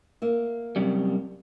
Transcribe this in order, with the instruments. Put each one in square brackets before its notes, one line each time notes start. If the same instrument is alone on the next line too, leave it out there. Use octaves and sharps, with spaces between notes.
[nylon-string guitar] A#3 E5
[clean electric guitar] F#2 C3 G3